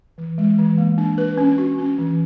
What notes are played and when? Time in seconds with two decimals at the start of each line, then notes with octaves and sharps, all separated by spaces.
0.18 E3
0.38 G#3
0.58 E3
0.78 A#3
0.98 D4
1.18 B4
1.38 C#4
1.58 F#4
1.78 C#4
1.99 E3